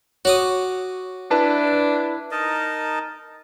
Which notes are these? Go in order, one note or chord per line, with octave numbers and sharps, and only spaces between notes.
F#4 C#5 D6 D#6
D4 E4 B4 A5
D#4 A#4 D#5 A5